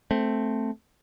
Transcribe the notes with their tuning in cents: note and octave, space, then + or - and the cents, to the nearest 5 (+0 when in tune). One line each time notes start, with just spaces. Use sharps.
A3 +0 C4 +0